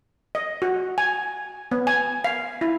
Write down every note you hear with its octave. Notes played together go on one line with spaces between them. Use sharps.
D#5
F#4
G#5
B3
G#5
F5
E4